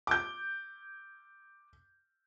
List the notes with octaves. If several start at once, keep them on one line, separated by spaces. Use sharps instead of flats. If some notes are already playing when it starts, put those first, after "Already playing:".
D6 G6